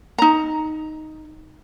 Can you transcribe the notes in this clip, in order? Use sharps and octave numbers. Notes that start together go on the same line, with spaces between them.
D#4 A#5